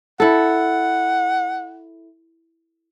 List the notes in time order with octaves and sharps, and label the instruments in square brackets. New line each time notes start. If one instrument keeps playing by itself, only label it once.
[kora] E4 A4 [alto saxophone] F#5